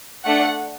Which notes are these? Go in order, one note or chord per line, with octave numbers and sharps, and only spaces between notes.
A3 D4 A4 F#5